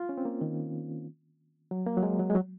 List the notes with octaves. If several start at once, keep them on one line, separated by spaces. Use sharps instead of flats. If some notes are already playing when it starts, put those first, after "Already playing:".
Already playing: F4
C#4
C4
A#3
D#3
F#3
A#3
F#3
G#3
F#3
G#3
F#3